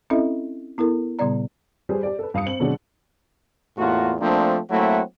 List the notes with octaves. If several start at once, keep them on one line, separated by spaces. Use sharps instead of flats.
C4 C#4 E4 A4 D#5 E5
B3 E4 A4 A#4
A#2 C#3 G3 B3 D5 A#5
G3 G#4 B4 C5
G4 D5
A4 B4
G2 F5 D#6 C#7
C4 F#7
B2 D3 F#3 G#3 C4 D4
E2 A2 A#3 F4 F#4
F3 A3 A#3 C4 D4
F#3 A3 A#3 C4 E4 F#4